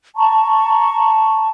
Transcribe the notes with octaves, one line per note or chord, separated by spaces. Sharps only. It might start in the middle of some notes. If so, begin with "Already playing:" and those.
A5 A#5 C#6